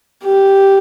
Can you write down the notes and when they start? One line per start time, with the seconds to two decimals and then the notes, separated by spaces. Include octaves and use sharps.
0.24 G4